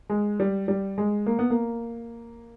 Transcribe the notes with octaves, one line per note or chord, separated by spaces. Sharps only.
G#3
G3
G3
G#3
A#3
B3
A#3